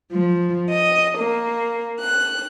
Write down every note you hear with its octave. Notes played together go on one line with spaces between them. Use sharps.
F3
D#5
A#3
F#6